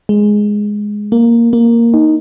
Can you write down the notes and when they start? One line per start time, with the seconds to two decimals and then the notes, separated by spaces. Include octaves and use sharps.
0.09 G#3
1.12 A#3
1.53 A#3
1.94 D#4